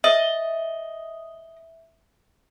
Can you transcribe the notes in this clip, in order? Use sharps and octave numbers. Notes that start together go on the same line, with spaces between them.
D#5 E5